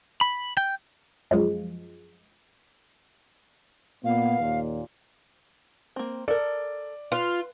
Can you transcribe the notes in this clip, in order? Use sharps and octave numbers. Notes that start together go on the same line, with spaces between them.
B5
G5
F#2 F3 G#3
A#2 B3 F5
D#2 A#2
A#3 C4
A4 A#4 D5
F4 B4